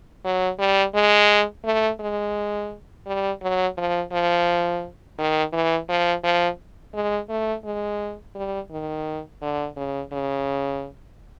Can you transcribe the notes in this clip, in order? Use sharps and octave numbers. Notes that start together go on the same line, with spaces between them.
F#3
G3
G#3
A3
G#3
G3
F#3
F3
F3
D#3
E3
F3
F3
G#3
A3
G#3
G3
D#3
D3
C#3
C#3